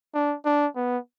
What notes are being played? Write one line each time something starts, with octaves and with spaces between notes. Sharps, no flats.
D4
D4
B3